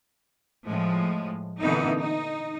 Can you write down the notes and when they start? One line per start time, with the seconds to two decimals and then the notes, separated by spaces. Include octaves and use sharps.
0.66 A2 F3 G#3
1.60 A#2 D3 E3 B3 C4 D#4
1.98 D#4